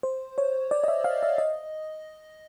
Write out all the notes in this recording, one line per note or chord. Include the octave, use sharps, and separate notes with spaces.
C5
C#5
D5
D#5
E5
F5
E5
D#5